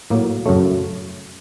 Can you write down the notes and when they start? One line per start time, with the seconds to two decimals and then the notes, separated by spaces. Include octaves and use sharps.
0.10 A2 F#3 A#3
0.46 F#2 C#3 F#3 A3